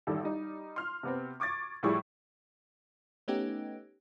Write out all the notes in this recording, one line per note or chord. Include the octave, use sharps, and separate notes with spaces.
A1 D#3 G3 A4
G3 D#4
C6 F6
C3 B3 C4
C#6 D6 G#6 A6
A2 F3 G3 E4 G#4 C#6
A3 B3 C#4 D#4 G4